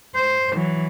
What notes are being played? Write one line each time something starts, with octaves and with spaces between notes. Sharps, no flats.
C5
E3 F#3